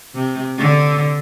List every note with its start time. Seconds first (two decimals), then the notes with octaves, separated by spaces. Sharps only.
0.14 C3
0.58 D3